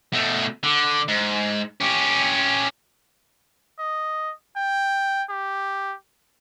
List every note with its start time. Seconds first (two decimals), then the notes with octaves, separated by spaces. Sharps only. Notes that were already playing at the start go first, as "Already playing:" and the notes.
0.13 B2 A3
0.63 D3
1.08 G#2
1.80 C#4 G4
3.79 D#5
4.57 G5
5.29 G4